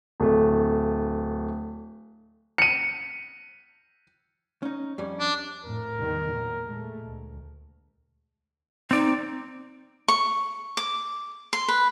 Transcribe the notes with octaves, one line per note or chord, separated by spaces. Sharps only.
D1 A3
C#7 D#7
C#4 D#4
F2 G3 C#4
D4
F2 A2 A#4
E2 D#3 G3
A#2 F#3
A#2 G#3 A3
D2
C4 D#4 D5
C#6
D6
C6
B4